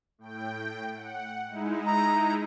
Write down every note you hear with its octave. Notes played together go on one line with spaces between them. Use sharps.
A2 G5
F#5
G#3 D#4 E4
A#5